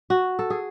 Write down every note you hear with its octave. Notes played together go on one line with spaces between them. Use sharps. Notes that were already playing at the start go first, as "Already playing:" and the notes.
F#4
A4
G#4